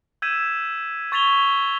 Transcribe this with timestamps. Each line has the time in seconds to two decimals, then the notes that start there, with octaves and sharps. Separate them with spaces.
0.22 E6 G6 G#6 B6 D#7 E7
1.12 C#6 G#6 A6 B6 F7 G7